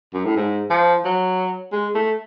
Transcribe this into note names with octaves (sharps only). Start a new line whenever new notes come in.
F#2
A2
G#2
F3
F#3
G#3
A3